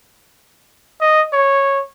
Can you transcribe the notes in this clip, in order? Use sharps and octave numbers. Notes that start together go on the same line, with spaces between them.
D#5
C#5